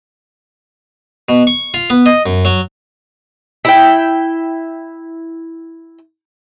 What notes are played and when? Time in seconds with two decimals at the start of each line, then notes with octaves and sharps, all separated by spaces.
1.29 B2
1.47 C#6
1.74 F4
1.90 B3
2.06 D#5
2.26 F#2
2.45 F#3
3.65 E4 G5